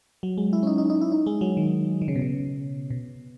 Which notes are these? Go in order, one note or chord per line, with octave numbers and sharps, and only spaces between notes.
F#3
G#3
E4
C#4
D#4
D#4
D#4
E4
D#4
G#3
F#3
D#3
D#3
C#3
B2
C#3
B2